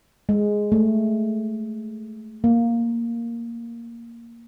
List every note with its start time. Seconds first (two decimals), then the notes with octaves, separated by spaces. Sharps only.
0.29 G#3
0.72 A3
2.44 A#3